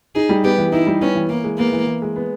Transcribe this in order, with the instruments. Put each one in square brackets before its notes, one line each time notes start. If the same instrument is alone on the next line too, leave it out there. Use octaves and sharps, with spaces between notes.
[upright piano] D#4 [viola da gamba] G#4
[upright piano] G3
[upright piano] B3 [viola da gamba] G4
[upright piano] E3
[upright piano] D#4 [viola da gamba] E4
[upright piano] G3
[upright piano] B3 [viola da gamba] C#4
[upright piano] E3
[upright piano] E3 [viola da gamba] A#3
[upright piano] G#3
[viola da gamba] A#3 [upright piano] B3
[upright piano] E3
E3
G#3
B3